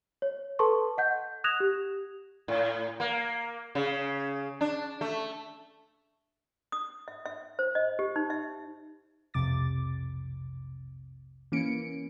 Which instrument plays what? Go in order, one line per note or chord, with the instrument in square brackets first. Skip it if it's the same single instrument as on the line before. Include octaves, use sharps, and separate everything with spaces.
[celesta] C#5
A4 B4 A5 C6 C#6
D#5 F#5 G6
D#6 F#6 G#6 A#6 E7 F7
G4
[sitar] A2
A#3
C#3
D4
A3
[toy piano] D#6
E5
E5
C5
D#5
G4
D#4
E5
[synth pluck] B1 F2 C3 D6 A6
E3 A#3 C#4 C#7 D7